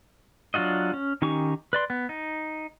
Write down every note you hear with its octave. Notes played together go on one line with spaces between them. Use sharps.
F#3 D4 F4 F#4 D#5
C#4
D#3 C#4 D#4 G4 C#6
B4 D5 C6
B3
D#4